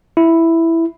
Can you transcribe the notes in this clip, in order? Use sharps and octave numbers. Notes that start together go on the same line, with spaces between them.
E4